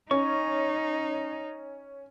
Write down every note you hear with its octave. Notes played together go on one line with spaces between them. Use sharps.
C#4 D#4 C#6